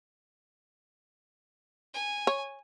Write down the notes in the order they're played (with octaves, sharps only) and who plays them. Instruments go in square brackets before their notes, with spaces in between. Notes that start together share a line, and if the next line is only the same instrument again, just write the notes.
[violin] G#5
[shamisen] C#5